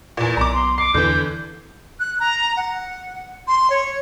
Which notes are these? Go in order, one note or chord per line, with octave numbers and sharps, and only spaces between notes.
E2 A#2
B1 B3 A#5 D6
C6
D6 C7
E2 D3 E3 G6
F#6
A#5
F#5
C6
C#5